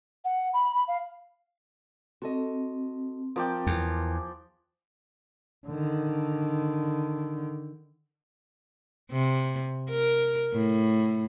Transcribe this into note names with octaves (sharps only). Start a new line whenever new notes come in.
F#5
B5
B5
F5
C4 F#4 A4 D#5
F3 A#4 D5 G5
E2 G#5
D3 D#3
C3
A#4
A2